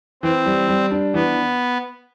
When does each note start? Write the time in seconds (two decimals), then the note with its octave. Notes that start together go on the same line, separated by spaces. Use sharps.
0.23 E3 C4
0.46 G3
0.68 G3
0.91 D4
1.14 E3 B3